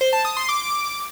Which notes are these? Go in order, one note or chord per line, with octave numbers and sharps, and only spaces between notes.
C5
A5
D#6
C6
D6